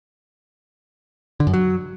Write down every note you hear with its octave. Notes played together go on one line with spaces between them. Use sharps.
D3
F#2
F#3